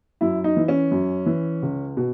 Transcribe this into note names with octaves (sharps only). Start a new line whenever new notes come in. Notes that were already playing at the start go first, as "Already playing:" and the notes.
F#2 E4
D#4
E3
C#4
F#2
E3
C#2
B2